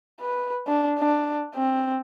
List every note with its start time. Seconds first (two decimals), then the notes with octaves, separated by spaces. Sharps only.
0.21 B4
0.67 D4
0.99 D4
1.55 C4